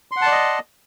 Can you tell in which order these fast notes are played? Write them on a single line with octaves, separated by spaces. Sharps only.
C6 F#5 A5 D5 D#5